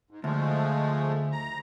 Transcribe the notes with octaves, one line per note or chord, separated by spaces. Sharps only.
G#2
D2 F3 G#3 A3
A#5